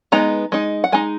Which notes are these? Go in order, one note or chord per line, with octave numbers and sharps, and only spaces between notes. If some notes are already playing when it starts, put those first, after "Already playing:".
G#3 B3 D#4 A#5
G#3 D#4
F#5
G#3 D#4 G#5